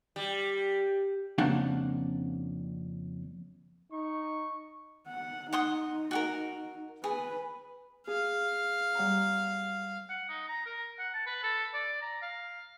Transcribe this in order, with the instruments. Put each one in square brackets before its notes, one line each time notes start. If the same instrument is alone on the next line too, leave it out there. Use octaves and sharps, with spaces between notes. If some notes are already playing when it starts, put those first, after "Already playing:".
[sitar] G3
[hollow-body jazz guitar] F2 C#3 A#3 D4 F#5
[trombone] D#4 [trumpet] C#6
[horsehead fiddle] F#5
[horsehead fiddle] D#4 [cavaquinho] F#5 C6 D#6
[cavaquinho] F#4 G4 A#4
[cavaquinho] G#4 [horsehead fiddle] B4
[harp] G#4 [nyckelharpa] F5
[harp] G3 F#5 A#5
[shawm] F#5
D#4
A#5
A#4
F#5
A5
B4
A4
D5
A#5
F5